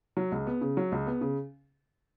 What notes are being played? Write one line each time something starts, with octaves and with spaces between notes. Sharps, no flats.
F#3
C#2
B3
C#3
F#3
C#2
B3
C#3